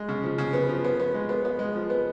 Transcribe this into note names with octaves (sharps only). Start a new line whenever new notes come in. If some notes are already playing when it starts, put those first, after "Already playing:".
Already playing: G#3
C#3
F3
C#3
B3
F3
B3
B3
G#3
B3
B3
G#3
F3
B3